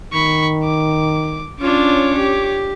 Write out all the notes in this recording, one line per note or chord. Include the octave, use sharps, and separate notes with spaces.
D#3 B5 C#6
D6
C#4 D4 F4 C#5 D6
G4